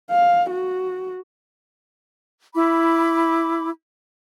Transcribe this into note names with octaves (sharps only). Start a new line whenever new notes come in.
F5
F#4
E4 B5 D6